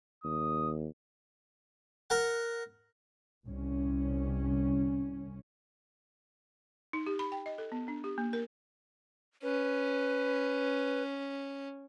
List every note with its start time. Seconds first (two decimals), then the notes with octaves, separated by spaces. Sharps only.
0.24 D#2 D#6
2.10 A#4 F#5
3.45 C2 C#4
6.93 D#4
7.06 G4
7.19 B5
7.32 G5
7.46 D#5
7.58 A4
7.72 B3
7.88 D4
8.04 G4
8.18 A#3
8.33 A#4
9.43 C#4 B4